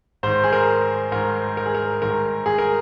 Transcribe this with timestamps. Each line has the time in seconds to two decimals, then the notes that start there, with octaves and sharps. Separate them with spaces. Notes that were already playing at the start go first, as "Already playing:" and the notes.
0.23 G#2 D#3 C5
0.44 G#4
0.53 A#4
1.12 G#2 D#3 A#4
1.57 A#4
1.66 G#4
1.75 A#4
2.02 G#2 D#3 A#4
2.46 G#4
2.58 A#4